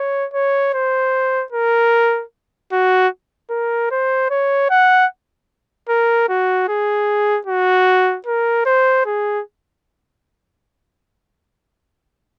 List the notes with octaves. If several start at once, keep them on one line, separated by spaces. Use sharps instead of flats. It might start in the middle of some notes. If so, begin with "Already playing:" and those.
Already playing: C#5
C#5
C5
A#4
F#4
A#4
C5
C#5
F#5
A#4
F#4
G#4
F#4
A#4
C5
G#4